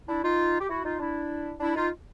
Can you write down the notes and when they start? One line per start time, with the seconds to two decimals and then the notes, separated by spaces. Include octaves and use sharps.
0.09 D4 E4
0.24 D#4 F4
0.60 G4
0.69 E4 F#4
0.85 D#4 F4
1.00 D4 E4
1.60 D4 E4
1.75 D#4 F4